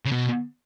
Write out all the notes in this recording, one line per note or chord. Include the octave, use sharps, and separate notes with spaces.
C#3
B2